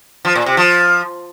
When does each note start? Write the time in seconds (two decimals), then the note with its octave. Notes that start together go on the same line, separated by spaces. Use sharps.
0.25 F3
0.36 A#2
0.46 C3
0.57 F3